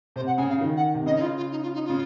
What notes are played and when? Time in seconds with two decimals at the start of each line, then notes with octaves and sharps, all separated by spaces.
0.16 C3 C5
0.26 F#5
0.38 C#3 G#5
0.49 F5
0.53 C#3
0.61 D#3
0.76 F#5
0.94 C3
1.06 C#3 D#5
1.16 D#4
1.21 F4
1.37 F4
1.51 D#4
1.63 F4
1.74 D#4
1.85 C#3 F4